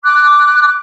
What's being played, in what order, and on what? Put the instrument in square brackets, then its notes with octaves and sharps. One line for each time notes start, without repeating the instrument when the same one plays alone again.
[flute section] D6 F#6